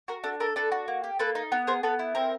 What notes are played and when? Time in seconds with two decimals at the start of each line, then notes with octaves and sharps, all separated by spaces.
0.08 F#4 A#4
0.24 D4 A4
0.40 A4 A#4
0.56 D4 A4 B4
0.72 F#4
0.88 A#3
1.04 G4
1.19 A#3 A4 B4
1.35 D#4
1.52 B3
1.67 G#4 A#4 C5
1.83 B3 A4 B4
1.99 E4
2.15 C4 A#4